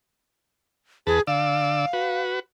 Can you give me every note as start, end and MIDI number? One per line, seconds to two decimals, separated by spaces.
1.07 1.20 40
1.07 1.22 68
1.07 1.20 71
1.07 1.20 81
1.27 1.86 50
1.27 1.86 74
1.27 2.21 77
1.27 1.86 88
1.93 2.40 66
1.93 2.40 71